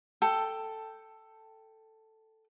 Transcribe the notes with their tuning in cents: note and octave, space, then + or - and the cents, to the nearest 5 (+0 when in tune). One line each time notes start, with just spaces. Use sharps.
A4 +5 G5 +0